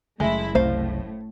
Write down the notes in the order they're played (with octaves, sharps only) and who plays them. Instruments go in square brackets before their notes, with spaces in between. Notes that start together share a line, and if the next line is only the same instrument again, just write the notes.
[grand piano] F#1 A#6 [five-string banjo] G#3 [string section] A3 E4
[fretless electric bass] C2 A3 [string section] A2 [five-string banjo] C5 F5